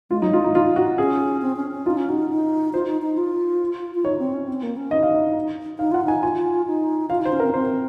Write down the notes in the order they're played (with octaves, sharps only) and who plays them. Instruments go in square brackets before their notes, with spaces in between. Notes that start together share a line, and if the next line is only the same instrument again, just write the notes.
[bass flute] G#3 [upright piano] F4
[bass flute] F#3 [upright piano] D#4
[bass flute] G#3 [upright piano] F4
[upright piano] D#4
[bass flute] D#4 [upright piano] F4
[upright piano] F#4
[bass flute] C#4 [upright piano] G#4
[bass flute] C4
C#4
C#4
[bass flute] D#4 [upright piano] F4
[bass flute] C#4
[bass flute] D#4 [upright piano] F#4
[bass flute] D#4
[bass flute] F4 [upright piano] C5
[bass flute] D#4
D#4
F4
F4
[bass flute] D#4 [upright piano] C#5
[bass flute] C4
C#4
C4
A#3
C#4
[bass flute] D#4 [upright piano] D#5
[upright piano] F5
D#5
[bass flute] D#4 [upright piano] F5
[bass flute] F4 [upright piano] F#5
[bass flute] D#4 [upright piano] G#5
[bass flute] F4 [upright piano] G#5
[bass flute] D#4
[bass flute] F4 [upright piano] F5
[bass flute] D#4 [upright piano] C5
[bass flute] C#4
[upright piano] A#4
[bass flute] C4
[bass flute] C4 [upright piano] C5